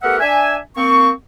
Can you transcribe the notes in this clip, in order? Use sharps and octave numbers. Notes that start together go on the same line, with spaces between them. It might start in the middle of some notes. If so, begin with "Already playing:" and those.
A3 B3 G4 A#4 E5 F#5
D4 E5 G#5
A#3 C4 C#6